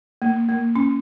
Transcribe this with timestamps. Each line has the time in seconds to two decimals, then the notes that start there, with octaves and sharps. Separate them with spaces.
0.22 A#3
0.49 A#3
0.75 C#4